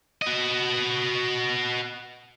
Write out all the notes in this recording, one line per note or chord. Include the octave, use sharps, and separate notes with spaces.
F#4 D#5